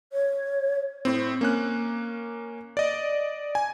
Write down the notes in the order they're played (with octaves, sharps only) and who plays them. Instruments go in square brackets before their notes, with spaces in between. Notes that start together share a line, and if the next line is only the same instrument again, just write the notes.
[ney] C#5
[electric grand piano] A2 C4
A#3 C#4 F#6
D5 D#5
G#5